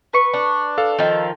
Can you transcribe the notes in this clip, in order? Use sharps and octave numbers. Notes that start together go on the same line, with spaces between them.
B4 C#6
D4
A4 F5
D#3 F3